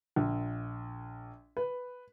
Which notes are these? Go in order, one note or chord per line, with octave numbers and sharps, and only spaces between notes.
A#1
B4